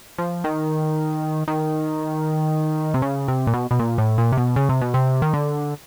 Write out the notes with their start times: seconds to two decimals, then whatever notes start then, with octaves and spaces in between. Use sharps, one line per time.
0.18 F3
0.44 D#3
1.48 D#3
2.94 C3
3.02 C#3
3.28 C3
3.47 A#2
3.54 B2
3.71 B2
3.79 A#2
3.98 A2
4.18 A#2
4.32 C3
4.37 B2
4.56 C#3
4.69 C3
4.81 B2
4.94 C3
5.22 D#3
5.34 D3